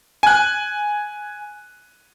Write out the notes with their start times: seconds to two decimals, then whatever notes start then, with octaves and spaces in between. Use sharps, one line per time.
0.23 G#5 F#6